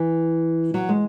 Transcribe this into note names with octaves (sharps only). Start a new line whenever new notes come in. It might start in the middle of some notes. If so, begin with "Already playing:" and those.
Already playing: E3
F#3
G#3